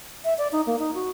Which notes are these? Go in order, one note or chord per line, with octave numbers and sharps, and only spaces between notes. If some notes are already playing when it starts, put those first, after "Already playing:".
E5
D5
D#4
A#3
D#4
F#4